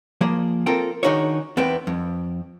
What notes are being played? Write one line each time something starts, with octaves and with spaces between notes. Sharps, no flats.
F3 A#3 G#4
C4 F4 A4 A#4 G5
D#3 D4 D#4 F#4 G#4 C#5
E2 B3 C4 G5
F2